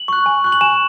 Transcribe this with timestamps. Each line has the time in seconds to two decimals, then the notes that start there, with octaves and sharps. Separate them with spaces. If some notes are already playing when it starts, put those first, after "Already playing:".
Already playing: F#7
0.08 C#6 F#6
0.26 G#5
0.44 C#6 F#6
0.52 F#7
0.61 G#5 E7